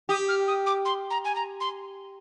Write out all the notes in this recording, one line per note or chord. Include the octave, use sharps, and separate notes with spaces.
G4 D#6
F6
D#6
D6
C6
A#5
G#5
A#5
C6